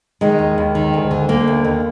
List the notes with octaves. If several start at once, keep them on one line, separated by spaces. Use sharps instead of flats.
D#3 G#3
D#2
D#2
D#3
D2
D3
D3 A#3
D2
D#2